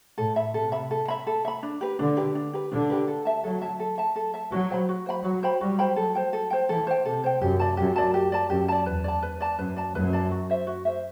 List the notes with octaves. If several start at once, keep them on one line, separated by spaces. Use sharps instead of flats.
A2 A4
E5 B5
C3 A4
E5 B5
A4
E5 B5
A4
E5 B5
D4
G4 B4
D3 D4
G4 B4
D4
G4 B4
D3 D4
G4 B4
A4
E5 A5
F#3 A4
E5 A5
A4
E5 A5
A4
E5 A5
F#3 F#4
C5 G5 B5
F#4
C5 G5 B5
F#3 F#4
C5 G5 B5
G3 F#4
C5 G5 B5
F#3 A4
C5 G5
A4
C5 G5
E3 A4
C5 G5
C3 A4
C5 G5
F#2 G4
D5 A5
F#2 G4
D5 A5
G4
D5 A5
F#2 G4
D5 A5
E2 B4
D5 A5
B4
D5 A5
F#2 B4
D5 A5
F#2 B4
D5 A5
F#4
C5 E5
F#4
C5 E5